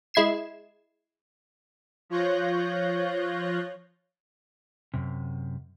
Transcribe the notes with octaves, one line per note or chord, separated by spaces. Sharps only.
G#3 E4 G#6 C7 E7
F3 F4 C#5 F#6 G6 A#6
F#2 C3